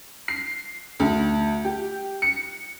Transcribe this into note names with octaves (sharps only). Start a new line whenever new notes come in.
C7
D2
G4
C#7